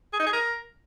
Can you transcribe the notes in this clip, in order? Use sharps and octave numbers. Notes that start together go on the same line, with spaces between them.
G#4
D#4
G#4
A#4